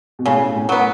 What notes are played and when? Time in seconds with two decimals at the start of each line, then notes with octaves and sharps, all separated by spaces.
0.19 B2
0.26 A2 C#3
0.55 A2
0.69 F#3 B3